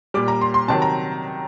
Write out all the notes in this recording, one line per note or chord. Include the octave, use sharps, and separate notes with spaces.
A#2 G3 D6
A#5
C6
C6
C3 D#3 F#3 A5
A#5